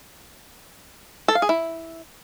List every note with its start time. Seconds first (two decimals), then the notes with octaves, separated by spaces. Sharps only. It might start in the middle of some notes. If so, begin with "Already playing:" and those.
1.28 A4
1.35 F5
1.42 G#4
1.49 E4